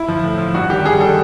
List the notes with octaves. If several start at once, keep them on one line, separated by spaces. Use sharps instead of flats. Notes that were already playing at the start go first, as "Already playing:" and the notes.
Already playing: E4
F3
A2
F3
G2 F#4
D#3 G3 G4
G2 G#4
D#3 G3 A4